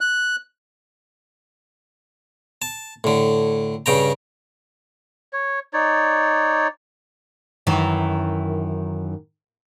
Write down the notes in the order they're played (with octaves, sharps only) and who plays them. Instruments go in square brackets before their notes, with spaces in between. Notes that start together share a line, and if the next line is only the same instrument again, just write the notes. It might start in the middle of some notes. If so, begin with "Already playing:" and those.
[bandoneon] F#6
[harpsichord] A5
A2 D3
G2 C#3 G5 A#5
[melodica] C#5
D#4 C#5 D5
[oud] F#2 D#3 E3